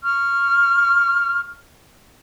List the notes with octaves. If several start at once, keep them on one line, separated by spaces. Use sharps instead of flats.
C#6 F6